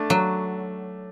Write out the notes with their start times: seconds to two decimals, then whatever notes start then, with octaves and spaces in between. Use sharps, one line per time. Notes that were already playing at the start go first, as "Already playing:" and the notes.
Already playing: A3 D4
0.10 F#3